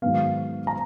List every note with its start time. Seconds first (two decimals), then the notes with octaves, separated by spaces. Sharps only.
0.02 G#2 D#3 F#3 B3 F5
0.67 A#5